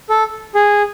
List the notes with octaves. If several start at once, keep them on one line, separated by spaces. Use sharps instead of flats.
A4
G#4